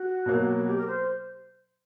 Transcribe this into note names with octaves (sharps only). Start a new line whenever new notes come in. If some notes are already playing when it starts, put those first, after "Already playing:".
Already playing: F#4
B2 F#3 A#3
F#4
G4
A#4
C5